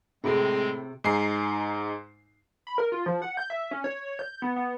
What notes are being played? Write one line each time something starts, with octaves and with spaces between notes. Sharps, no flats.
A2 C3 G#3 C4 G#4 D7
G#2 D#4 G#5 C7
B5
A#4
F4
F3
F#5
G6
E5
C#4
C#5
G6
B3
B3